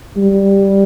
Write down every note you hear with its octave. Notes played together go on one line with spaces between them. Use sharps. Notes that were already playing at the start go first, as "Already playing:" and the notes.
G3